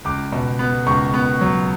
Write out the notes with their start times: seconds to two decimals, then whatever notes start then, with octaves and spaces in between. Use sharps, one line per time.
0.05 C#2 D6
0.32 B2
0.59 B3
0.86 C#2 C#6
1.14 B3
1.41 F#3